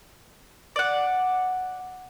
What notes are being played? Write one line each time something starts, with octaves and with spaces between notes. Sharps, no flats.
D5 F#5